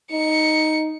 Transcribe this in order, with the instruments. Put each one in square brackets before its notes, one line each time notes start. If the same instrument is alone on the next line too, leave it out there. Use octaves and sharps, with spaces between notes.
[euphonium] D#4 [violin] C#7